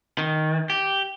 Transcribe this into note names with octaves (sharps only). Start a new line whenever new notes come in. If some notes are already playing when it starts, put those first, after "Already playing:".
D#3
G4